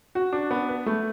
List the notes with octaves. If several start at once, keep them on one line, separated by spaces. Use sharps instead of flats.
F#4
D4
B3
B4
A3